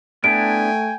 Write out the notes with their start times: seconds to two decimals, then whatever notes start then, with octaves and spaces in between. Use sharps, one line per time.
0.24 A3 B3 D4 E4 G5 G#5 D7